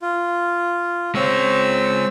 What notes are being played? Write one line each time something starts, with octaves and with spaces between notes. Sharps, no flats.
F4
G#3 C4 C#5 E6